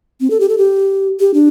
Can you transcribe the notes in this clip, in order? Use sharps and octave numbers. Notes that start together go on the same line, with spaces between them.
C4
A4
G4
A4
G4
G4
D4